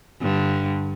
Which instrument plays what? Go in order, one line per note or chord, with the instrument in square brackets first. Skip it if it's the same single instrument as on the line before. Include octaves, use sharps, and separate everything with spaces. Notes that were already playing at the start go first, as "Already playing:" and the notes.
[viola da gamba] G2 D3